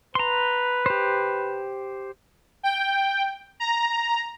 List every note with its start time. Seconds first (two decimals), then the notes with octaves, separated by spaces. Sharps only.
0.15 B4 A#5 C6
0.86 G4 C5
2.63 G5
3.60 A#5